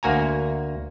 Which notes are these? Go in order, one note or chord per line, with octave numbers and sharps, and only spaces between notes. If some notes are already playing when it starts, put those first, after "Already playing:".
D2 A#3 F#4 G#5 A#5